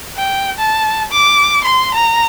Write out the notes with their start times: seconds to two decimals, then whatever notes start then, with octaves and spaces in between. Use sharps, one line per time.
0.17 G5
0.59 A5
1.11 D6
1.64 C6
1.94 A#5